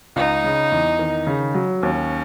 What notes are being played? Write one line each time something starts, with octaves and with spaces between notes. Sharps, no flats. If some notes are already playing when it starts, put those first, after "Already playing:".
C#2 D#4
C#3
E2
D#3
C#3
F#3
D#2 C#4